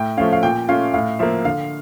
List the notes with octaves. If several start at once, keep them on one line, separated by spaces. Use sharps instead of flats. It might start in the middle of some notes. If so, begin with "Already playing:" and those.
Already playing: A2 G5
F3 A3 C#4 F5
F5
A#2 G5
A3 C#4 F4 F5
A2 F5
F3 A#3 E5
D3 F5